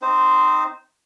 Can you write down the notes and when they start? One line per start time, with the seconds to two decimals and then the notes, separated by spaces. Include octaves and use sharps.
0.02 C4 D#4 C5